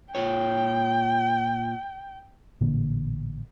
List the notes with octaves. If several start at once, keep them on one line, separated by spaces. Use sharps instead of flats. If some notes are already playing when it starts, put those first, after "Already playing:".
A#2 F4 C#5 G5
A1 A#2 D3 A#3